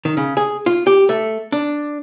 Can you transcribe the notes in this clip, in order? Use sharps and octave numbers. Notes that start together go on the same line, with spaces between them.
D#3
C#3
G#4
F4
G4
A3
D4